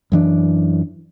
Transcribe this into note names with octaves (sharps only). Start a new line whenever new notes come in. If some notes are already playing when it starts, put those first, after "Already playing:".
F#2 E3 D4